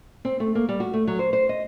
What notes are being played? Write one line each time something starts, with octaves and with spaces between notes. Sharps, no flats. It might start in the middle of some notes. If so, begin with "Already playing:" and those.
C4
A3
A#3
G3
F#4
A3
F#3
C5
C5
D#5